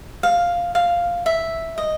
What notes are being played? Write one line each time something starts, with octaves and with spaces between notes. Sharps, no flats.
F5
F5
E5
D#5